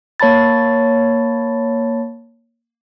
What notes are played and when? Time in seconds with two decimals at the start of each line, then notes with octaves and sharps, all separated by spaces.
0.20 A#3 C#5 A5 B5 A6